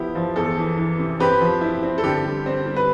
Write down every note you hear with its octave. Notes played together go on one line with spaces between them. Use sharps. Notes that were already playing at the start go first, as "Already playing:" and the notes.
Already playing: F3 B3 E4 G4
F3
E2 A4
E3
E3
C3
C4 G4 B4
F3
E4
C4
A4
D3 G4
G3
C4
G3
B4